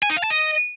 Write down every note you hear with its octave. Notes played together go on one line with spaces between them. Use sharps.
G#5
D#4
F5
A5
D#5